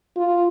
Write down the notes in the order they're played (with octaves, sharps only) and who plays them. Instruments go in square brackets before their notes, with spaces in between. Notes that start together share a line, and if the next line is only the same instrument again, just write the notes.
[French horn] F4